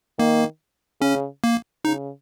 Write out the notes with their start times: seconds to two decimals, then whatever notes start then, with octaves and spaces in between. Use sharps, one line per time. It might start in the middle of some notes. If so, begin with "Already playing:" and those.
0.19 D#3 A#3
1.01 C#3 C#4
1.44 A#3
1.85 C#3 D#4